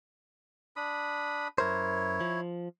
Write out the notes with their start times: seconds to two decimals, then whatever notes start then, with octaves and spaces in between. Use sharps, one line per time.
0.76 D4 B5 D#6
1.58 F#2 E4 A#4 C5 C#5
2.21 F3